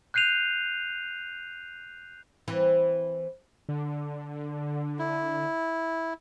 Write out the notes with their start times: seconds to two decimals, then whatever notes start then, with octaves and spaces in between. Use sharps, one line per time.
0.14 F#6 G6 C7 D#7 F7
2.48 E3 C4
3.69 D3
4.99 E4